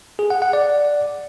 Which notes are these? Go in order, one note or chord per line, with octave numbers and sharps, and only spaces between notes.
G#4
F#5
F#5
D5